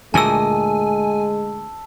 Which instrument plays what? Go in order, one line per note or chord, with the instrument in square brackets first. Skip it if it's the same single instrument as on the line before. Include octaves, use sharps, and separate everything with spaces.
[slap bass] D2 A#2 [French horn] G#3 [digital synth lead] G#5 [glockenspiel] A5 E6